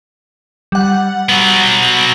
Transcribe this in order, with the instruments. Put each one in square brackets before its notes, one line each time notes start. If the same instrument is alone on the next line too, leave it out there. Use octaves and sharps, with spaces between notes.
[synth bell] G3 F#5
[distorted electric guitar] F#3 B3